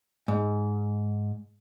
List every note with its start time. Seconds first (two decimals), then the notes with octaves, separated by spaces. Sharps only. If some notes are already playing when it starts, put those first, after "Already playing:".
0.28 G#2